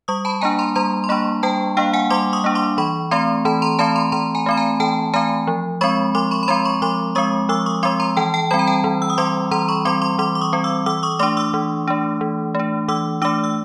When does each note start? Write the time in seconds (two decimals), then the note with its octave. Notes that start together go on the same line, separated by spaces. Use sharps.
0.08 G3 C#6 D#6
0.25 A5 B5
0.41 A#3 D4 G#5 A#5
0.59 A#5 C6
0.75 G3 A#5 C6
1.04 C6
1.09 A#3 D4 B5 C#6
1.43 G3 G5 A5
1.77 A#3 D4 F5 G5
1.93 F#5 G#5
2.10 G3 C6 D6
2.33 C#6 D#6
2.44 A#3 D4
2.55 C6 D6
2.78 E3 B5 C#6
3.11 A3 C4 A#5 C6
3.45 E3 A5 B5
3.62 A#5 C6
3.79 A3 C4 A5 B5
3.96 A#5 C6
4.12 E3 A#5 C6
4.35 G#5 A#5
4.46 A3 C4 B5
4.57 G#5 A#5
4.80 E3 G5 A5
5.14 A3 C4 G#5 A#5
5.47 F3
5.81 G#3 C4 B5 C#6
6.15 F3 C6 D6
6.31 B5 C#6
6.43 B5
6.48 G#3 C4 A#5 C6
6.65 B5 C#6
6.82 F3 C6 D6
7.15 G#3 C4 C#6 D#6
7.49 F3 D6 E6
7.66 C#6 D#6
7.83 G#3 C4 C6 D6
8.00 A#5 C6
8.17 E3 G5 A5
8.34 G5 A5
8.51 G3 C4 B5
8.59 A#5
8.67 G5 A5
8.84 E3
9.02 E6
9.10 D#6
9.18 G3 C4 C6 D6
9.51 E3 A#5 C6
9.68 B5 C#6
9.85 G3 C4 C6 D6
10.01 C6 D6
10.19 E3 C6 D6
10.35 D6
10.41 C#6 D#6
10.53 G3 C4
10.64 D6 E6
10.86 E3 D6 E6
11.03 C#6 D#6
11.19 A3 D4 C6 D6
11.37 D6 E6
11.54 E3
11.88 A3 D4
12.21 E3
12.55 A3 D4
12.88 E3 D6 E6
13.22 A3 D4 D6 E6
13.44 E6